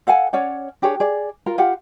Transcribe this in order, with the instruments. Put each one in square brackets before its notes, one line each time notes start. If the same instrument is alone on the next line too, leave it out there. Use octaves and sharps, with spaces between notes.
[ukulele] A4 F5 F#5 G#5
C#4 C#5 D5 F#5
D4 G4 G#4 C#5
G#4 D5
F4 A#4
F4 G4 F5 F#5